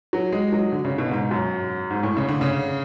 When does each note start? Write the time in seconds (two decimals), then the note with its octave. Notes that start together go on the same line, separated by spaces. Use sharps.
0.13 F#3
0.32 G#3
0.52 F#3
0.72 D3
0.85 C#3
0.98 B2
1.11 G#2
1.31 F#2
1.90 G#2
2.03 A2
2.17 C#3
2.28 D3
2.41 C#3